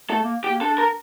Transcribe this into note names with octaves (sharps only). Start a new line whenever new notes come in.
A3 A4
A#3
G4
A#3
D4 A4
A#4